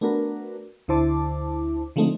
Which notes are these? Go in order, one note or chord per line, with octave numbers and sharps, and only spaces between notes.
A3 B3 D4 F#4 A#4 B4
D2 D3 E4 C5 A5 D6
D3 F3 G#3 A3 C4 D#4